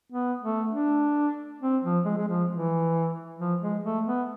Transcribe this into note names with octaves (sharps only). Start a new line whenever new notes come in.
B3
A3
D4
C4
F3
G#3
G#3
F3
E3
F3
G#3
A3
B3